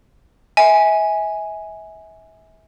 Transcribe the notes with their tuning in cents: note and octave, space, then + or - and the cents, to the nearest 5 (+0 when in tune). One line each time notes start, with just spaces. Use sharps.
E5 -35 G#5 +0